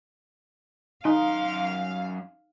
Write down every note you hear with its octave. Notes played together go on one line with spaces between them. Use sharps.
F#2 D#4 F5 C6